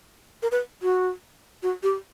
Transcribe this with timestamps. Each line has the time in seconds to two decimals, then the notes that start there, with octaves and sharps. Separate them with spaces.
0.43 A#4
0.52 B4
0.82 F#4
1.63 F#4
1.83 G4